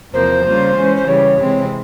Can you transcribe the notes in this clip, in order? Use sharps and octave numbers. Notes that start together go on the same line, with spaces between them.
E2 C3 F3 A#3 C5
C#3 G3 A#3 F4
E3 G#3 C#4
C5
C#3 E3 G3 C#5
C3 E3 G#3 C4